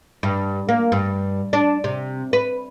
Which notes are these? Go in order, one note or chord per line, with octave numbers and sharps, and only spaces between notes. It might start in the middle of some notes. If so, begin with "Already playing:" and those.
G2
A#3
G2
D4
C3
B4